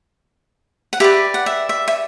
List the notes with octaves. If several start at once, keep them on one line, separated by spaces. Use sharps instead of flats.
F#5
G4 B4 D5 E5
F#5
E5
E5
E5